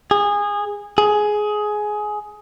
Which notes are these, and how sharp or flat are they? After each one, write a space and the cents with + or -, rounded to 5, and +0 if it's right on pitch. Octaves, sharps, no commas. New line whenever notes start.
G#4 -20
G#4 +15